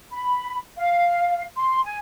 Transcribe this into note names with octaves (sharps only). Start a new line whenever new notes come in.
B5
F5
C6
G#5